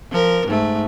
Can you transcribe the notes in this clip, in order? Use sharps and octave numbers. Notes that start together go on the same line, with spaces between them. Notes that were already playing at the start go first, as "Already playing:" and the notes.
F3 A#4
G#2 A3